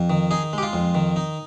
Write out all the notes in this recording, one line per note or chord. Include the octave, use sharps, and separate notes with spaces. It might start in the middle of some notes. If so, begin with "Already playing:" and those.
Already playing: F2
D#3
D#4 G#4
G#3 G4
F4
F2
D#3
D#4